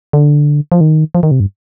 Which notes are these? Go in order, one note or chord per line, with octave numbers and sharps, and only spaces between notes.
D3
F3
D#3
F3
D#3
C3
G2